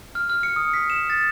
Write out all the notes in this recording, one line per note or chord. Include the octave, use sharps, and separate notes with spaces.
F6
F6
C#7
D#6
B6
E7
A6